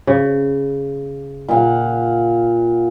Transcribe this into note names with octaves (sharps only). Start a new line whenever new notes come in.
C#3
A#2 F5 F#5